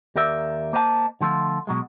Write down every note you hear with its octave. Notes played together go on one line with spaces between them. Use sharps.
D#2 G4 A#4 D5 E5
A#3 C5 D#5 F5 A5
D3 F3 A3 F4
B2 F#3 G#3